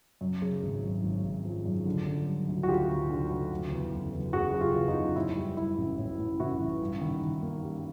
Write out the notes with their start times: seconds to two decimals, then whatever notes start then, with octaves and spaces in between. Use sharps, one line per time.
0.21 F#2
0.42 C#3
0.63 G#1
0.83 G#1
1.03 G#1
1.24 G#1
1.45 F3
1.66 F#2
1.86 D3
2.06 D3
2.27 G3
2.48 D2
2.63 F#4
2.68 D2 F4 G4
2.89 D2
3.10 D3
3.30 D2
3.51 F#1
3.71 E2
3.92 F#1
4.13 E2
4.33 F#1 F#4 G#4
4.54 C#3
4.61 F4 G4
4.74 E2
4.88 D#4 F4
4.95 F#1
5.16 A2 E4
5.37 G3
5.57 G3 E4
5.78 A1
5.98 A2
6.19 A2
6.40 A1 E4 F#4
6.60 E3
6.81 G2
7.01 D#3
7.22 D#3
7.42 A#3
7.63 G3